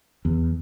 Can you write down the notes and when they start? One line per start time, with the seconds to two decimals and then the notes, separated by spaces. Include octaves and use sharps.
0.25 E2